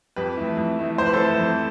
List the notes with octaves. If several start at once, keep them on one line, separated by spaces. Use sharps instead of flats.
F2 G4 B4
E3 A3
F2
E3 A3
F2 C5
B4
A4 C5
E3 A3
F2